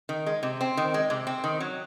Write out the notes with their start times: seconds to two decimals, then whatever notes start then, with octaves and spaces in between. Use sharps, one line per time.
0.09 D#3
0.26 G#3
0.43 C3
0.61 C4
0.77 D#3
0.94 G#3
1.10 C3
1.27 C4
1.44 D#3
1.60 F#3